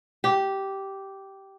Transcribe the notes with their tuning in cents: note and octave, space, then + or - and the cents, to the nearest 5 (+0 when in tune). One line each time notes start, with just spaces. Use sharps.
G4 -10